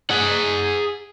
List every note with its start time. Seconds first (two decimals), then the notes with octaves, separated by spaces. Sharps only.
0.10 G#4 F#5